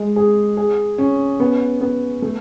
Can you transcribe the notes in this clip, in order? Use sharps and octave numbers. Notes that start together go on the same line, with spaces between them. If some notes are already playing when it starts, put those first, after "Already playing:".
Already playing: G#3
G#4
G#4
C#4
B3
B3
A3